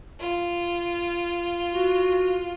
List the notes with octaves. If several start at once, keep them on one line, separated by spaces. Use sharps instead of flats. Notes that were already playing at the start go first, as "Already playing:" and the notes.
F4
F#4